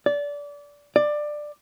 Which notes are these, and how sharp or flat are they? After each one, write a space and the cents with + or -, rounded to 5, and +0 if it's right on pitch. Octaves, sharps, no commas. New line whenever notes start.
D5 -25
D5 +15